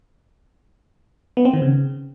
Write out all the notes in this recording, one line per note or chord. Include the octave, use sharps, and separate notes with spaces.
B3
C4
D#3
C#3